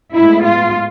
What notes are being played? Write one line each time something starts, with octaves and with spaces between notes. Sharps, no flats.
A2 G#3 B3 E4
F4